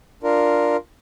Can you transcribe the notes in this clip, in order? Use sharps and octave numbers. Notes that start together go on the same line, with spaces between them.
D4 F4 A#4